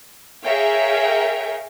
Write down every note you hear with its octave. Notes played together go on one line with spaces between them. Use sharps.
G#4 A#4 C#5 E5 F5 G5